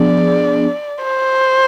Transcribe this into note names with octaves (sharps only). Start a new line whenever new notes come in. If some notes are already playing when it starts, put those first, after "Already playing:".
Already playing: F3 B3 D4 G#4 D5
C5